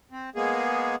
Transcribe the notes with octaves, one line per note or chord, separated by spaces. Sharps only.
C4
G#3 A#3 B3 G#4